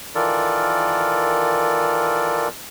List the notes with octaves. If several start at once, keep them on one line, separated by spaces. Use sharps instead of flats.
D#3 E3 F4 A4 A#4 D5